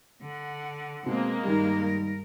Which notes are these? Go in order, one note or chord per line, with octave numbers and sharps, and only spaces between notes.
D3 F#5
B2 G#3 A#3 C4
G2 D#3 G3 A#4